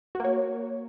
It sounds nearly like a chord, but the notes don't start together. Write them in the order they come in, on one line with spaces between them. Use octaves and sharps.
F#4 A#3 C#5